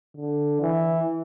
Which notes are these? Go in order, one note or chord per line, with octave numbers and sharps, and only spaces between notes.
D3
E3